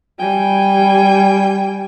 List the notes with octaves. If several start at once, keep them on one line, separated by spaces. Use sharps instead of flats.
G3 G5 G#5